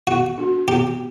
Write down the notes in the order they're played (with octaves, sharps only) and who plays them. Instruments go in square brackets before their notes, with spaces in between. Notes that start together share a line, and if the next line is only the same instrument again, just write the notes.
[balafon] B3 [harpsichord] F#4
[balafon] D4 F#4
[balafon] B3 [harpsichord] G4